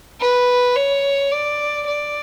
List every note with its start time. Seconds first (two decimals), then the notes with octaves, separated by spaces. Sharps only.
0.21 B4
0.76 C#5
1.32 D5
1.87 D5